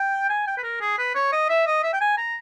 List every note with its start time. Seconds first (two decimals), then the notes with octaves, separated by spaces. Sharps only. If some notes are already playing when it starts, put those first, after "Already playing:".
Already playing: G5
0.29 G#5
0.47 G5
0.57 B4
0.63 A#4
0.81 G#4
0.98 B4
1.15 C#5
1.32 D#5
1.49 E5
1.66 D#5
1.83 E5
1.93 G5
2.01 G#5
2.18 A#5